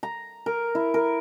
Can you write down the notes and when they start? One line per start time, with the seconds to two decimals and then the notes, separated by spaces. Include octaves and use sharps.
0.03 A#5
0.46 A#4
0.75 E4
0.94 A#4